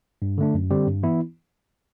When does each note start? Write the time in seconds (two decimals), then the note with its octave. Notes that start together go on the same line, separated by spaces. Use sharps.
0.22 G2
0.38 D3 A3 D4
0.54 F#2
0.71 D3 G3 C4 G4
0.87 G2
1.03 E3 B3 E4